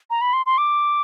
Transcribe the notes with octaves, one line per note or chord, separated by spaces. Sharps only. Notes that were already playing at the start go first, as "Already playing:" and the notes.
A#5
B5
C6
C6
D6